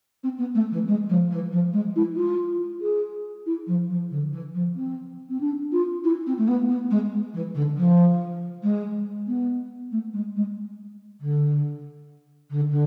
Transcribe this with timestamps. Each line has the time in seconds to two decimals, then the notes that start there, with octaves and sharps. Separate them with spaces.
0.23 C4
0.38 B3
0.55 A3
0.71 E3
0.87 G#3
1.09 F3
1.31 E3
1.52 F3
1.73 G#3
1.96 E4
2.16 F4
2.81 G#4
3.46 E4
3.67 F3
3.89 F3
4.11 D3
4.32 E3
4.54 F3
4.75 C4
5.29 C4
5.40 D4
5.72 F4
6.04 E4
6.26 C4
6.38 A3
6.48 B3
6.69 B3
6.91 G#3
7.34 E3
7.55 D3
7.77 F3
8.63 G#3
9.27 B3
9.92 A3
10.13 G#3
10.36 G#3
11.21 D3
12.50 D3
12.70 D3